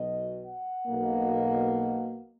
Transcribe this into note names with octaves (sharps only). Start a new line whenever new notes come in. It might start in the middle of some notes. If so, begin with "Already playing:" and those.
Already playing: B1 B2 F#3 D#5
F#5
B1 B2 A#3